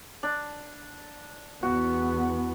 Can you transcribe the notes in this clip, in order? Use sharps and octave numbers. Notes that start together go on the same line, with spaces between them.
D4
E2 B3 F#4